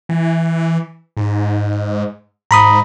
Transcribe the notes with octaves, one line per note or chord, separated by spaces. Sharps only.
E3
G#2
G#2 A#5 B5 D#6